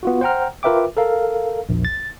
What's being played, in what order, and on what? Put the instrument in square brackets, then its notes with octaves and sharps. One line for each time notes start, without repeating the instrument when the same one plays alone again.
[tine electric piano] B3 F4 F#4
C5 F#5 G5 A#5 F6
F4 A#4 B4 E5 G5 D6
A4 A#4 F5
A#1 E2
A6